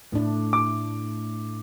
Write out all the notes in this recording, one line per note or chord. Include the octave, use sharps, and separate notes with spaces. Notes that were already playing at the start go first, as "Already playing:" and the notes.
A2 A3 D4
D6